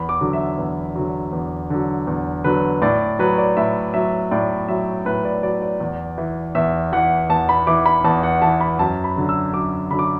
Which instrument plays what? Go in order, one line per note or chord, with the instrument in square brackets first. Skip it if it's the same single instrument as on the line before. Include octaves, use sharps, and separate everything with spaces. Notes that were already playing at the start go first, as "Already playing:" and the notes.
Already playing: [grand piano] E2 B5
D6
D3 F#3
E5
E2
D3 F#3
E2
D3 F#3
E2
D3 F#3 B4
A2 D5
F#3 B4
D5
A2 E5
F#3 E5
A2 D5
F#3 E5
A2 B4
D5
F#3 D5
D5
E2
E3
E2 E5
E3 F#5
E2 A5
B5
E3 D6
B5
E2 A5
F#5
E3 A5
B5
F#2 A5
B5
D3 F#3
E6
F#2 D6
D3 F#3 B5
D6